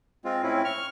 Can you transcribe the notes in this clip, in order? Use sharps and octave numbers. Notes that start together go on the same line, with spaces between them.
G#3 C4 F4
A2 C4 C#4 E4
C#6 F6